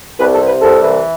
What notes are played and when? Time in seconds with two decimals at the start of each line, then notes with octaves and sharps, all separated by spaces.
0.19 C2 B4
0.33 A4
0.40 C3
0.47 B4
0.61 C2 A4
0.83 E3